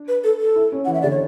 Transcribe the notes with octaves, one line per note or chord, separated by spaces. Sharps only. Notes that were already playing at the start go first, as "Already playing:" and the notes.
Already playing: D4
B4
A4
A4
E4
C#4
E3 F#5
E5
D3 D5
C#5